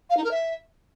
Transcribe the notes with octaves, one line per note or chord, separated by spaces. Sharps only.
F5
D#4
A#4
E5